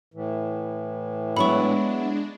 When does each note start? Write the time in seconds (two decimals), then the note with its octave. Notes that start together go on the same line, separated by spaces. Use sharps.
0.14 A2 E3
1.37 F#3 G#3 B3 D4 E4 B5 C#6